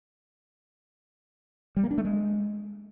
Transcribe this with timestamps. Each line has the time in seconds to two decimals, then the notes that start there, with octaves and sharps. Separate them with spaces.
1.76 G3
1.84 A#3
1.91 D4
1.98 A3
2.05 G#3